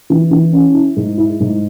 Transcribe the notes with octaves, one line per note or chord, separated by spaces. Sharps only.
E3
E3
C#4
E4
G#2
E4
G#2